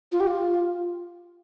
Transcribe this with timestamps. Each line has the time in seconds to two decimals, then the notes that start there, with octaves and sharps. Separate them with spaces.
0.12 F4
0.20 G4
0.27 F4